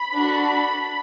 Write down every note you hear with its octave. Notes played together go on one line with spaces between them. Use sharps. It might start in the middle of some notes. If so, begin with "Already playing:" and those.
Already playing: B5
D4 F#4 A4